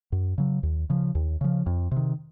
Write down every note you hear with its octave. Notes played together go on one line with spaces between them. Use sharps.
F#2
C#3 F#3
D#2
C#3 F3
D#2
C#3 F3
F2
C3
D#3